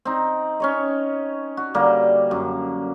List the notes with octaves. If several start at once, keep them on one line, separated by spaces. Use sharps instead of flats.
C4 D#4
C#4 C#5 D#5
F#4
D3 G3 A#3
F#2